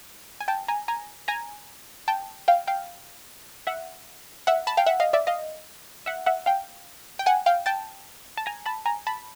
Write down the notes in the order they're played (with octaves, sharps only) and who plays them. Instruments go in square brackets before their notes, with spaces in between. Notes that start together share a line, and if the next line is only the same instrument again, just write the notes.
[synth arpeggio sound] G#5
G5 A5
G#5 A#5
G#5 A#5
G#5 A#5
G5 A5
F5 G5
F5 G5
E5 F#5
E5 F#5
A5 B5
F5 G5
E5 F#5
D#5 F5
D5 E5
D#5 F5
E5 F#5
E5 F#5
F5 G5
G5
F#5 G#5
F5 G5
G5 A5
A5
G#5 A#5
A5 B5
G#5 A#5
A5 B5